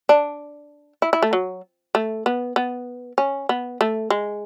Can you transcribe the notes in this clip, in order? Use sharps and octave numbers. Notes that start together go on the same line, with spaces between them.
D4
E4
E4
A3
F#3
A3
B3
B3
C#4
B3
A3
G#3